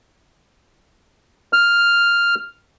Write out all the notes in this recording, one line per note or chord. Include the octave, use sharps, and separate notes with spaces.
F6